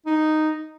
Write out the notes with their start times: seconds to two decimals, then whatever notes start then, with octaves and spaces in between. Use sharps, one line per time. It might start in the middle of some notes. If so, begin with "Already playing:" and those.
0.06 D#4